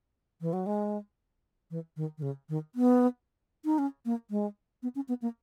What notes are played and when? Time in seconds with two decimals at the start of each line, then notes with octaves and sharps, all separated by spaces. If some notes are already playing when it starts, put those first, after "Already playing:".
0.41 E3
0.53 F#3
0.66 G#3
1.71 E3
1.97 D#3
2.18 D#3
2.22 C#3
2.49 D#3
2.75 B3
3.65 D#4
3.78 C#4
4.05 A#3
4.31 G#3
4.83 B3
4.95 C#4
5.09 B3
5.22 A#3